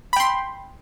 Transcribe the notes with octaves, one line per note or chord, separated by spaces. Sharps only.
G5 B5 C6